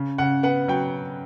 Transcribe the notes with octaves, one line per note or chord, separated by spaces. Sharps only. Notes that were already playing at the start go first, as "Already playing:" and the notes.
Already playing: C#3
C#3 F#5
B3 F#5
F#3 G5